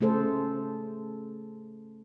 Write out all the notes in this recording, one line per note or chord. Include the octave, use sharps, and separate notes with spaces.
C#3 A3 G#4 A4 C5